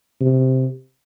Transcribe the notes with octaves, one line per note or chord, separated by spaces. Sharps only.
C3